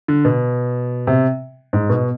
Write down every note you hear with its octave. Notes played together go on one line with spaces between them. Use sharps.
D3
B2
C3
G#2
B2